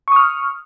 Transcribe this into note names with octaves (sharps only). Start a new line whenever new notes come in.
C#6 D#6 F6